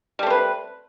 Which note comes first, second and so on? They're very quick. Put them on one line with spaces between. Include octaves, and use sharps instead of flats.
G3 A3 C4 B4